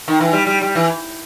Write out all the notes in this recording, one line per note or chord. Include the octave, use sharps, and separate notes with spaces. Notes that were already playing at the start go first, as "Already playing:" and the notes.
D#3
E3
G3
G3
G3
E3